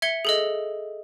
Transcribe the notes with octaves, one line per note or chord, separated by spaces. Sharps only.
E5 G#6 C#7 G7
G#4 A4 D#5